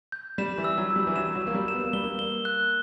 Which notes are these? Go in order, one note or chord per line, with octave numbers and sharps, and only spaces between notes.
G6
G3 E7
E3
E6
F#3
E6
G3
E3
F#3 E7
F#3
A#3 E6
G3
E7
B3
A#3
G3 G7
A#3
G7
F#6